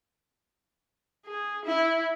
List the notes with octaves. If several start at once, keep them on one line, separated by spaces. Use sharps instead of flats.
G#4
E4